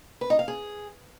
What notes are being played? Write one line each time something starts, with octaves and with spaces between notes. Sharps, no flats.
B4
D#4
F5
G#4